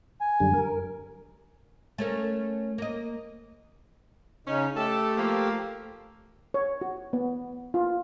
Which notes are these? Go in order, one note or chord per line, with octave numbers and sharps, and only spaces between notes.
G#5
F#2 D3 G3
A#4
A3 C#4 A#4
A#3 D#5
C#3 C#4 D#4
A3 G4 A4
F3 A#3
C#5
F#4
B3
F4